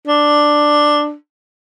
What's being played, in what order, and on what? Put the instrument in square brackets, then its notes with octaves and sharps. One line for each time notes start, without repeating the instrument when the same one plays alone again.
[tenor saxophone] D4